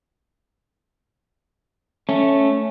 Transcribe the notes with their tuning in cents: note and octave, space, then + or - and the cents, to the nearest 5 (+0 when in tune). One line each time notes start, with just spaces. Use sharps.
A3 +0 C#4 +0